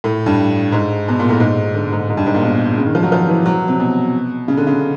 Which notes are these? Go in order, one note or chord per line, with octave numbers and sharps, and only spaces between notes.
A2
G2
G#2
B2
A#2
A2
G#2
D3
G#2
G#2
G2
G#2
A#2
B2
C#3
D#3
F3
F#3
F3
E3
F#3
C3
B2
C#3
D3
C#3